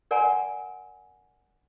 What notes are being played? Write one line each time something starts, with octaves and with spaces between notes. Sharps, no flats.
A#4 D5 F#5 G#5 A#5 C6